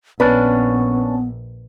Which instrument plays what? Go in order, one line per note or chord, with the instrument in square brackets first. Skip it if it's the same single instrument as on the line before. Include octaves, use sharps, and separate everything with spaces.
[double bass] A#1 [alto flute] B3 [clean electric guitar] C#4 D4 [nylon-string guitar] B4